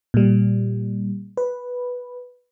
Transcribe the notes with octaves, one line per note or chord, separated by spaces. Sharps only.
A#2 G3
B4